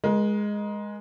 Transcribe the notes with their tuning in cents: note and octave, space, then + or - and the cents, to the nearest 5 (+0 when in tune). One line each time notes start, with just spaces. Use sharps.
G#3 +0 A#4 +35